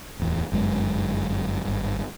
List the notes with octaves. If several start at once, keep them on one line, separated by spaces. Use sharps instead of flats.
D1 E2
G1 F#2 G#3
G#1 G2